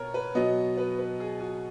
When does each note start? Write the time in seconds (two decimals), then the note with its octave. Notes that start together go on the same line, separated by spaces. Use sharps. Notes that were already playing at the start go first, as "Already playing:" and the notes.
Already playing: B2 B3 A#4 C#5
0.14 B4
0.35 B2 F#3 B3 D#5
0.77 B4
0.99 B4
1.20 G#4
1.40 F#4